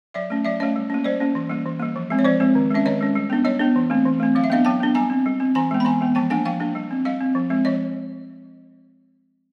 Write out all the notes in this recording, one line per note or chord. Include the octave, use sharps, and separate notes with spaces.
F#3 D5 E5
A3 C#4
F#3 D5 E5
A3 C#4 C#5 D#5
G3
A#3 C#4
G3 C5 D5
A#3 C#4
E3
G3 A#3
E3
G3 A#3
F3
G#3 C4
C#5
F3 C5 D5
G#3 C4
D#3
G#3 C#4 E5
D#3 C#5 D#5
G#3 C#4
G3
B3 D4
G3 C#5 D#5
B3 D4
E3
A3 C4
E3
A3 C4
F#3 F5
E5
B3 D4 D#5 F5
F#3 G5 A5
B3 D4
G3 G#5 A#5
C4
G3
C4
E3 G#5 A#5
G#3 B3
B5
E3 G#5 A#5
G#3 B3
F3 G5 A5
A#3 D4 F#5 G#5
F3 F5 G5
A#3 D4
G3
C4
G3 D#5 F5
C4
F3
G#3 C4
F3 C#5 D#5